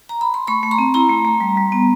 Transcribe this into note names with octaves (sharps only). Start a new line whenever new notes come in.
A#5
B5
C6
A3 B5 C#6
A3
A#5 C6
C4
E4 A#5 C6
A3
A3
G3
G3
B3